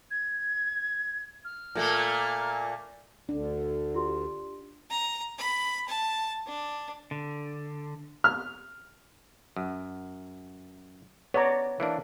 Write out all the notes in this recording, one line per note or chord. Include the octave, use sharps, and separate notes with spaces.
G#6
F6
A#2 A3 A#3
D2 D3 D4
F4 G4 C6
A#5
B5
A5
D4
D3
F6
F#2
B3 C#5 D5 A#5
E3 A#3 D4